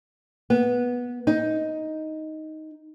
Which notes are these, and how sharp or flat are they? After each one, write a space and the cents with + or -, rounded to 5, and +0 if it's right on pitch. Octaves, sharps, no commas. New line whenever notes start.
B3 -15
D#4 +5